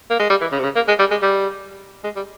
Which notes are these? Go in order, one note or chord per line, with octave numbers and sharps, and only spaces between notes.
A#3
G#3
G3
E3
C#3
C3
C#3
A#3
G#3
G3
G#3
G3
G#3
G3